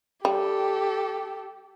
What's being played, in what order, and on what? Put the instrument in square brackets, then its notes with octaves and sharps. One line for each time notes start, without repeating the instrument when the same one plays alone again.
[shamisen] G3 [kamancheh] G4 A4